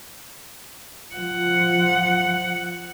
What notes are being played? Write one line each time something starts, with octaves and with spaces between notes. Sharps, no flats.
F3 F#5